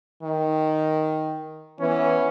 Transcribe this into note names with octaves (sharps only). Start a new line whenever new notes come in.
D#3
E3 B3 C#4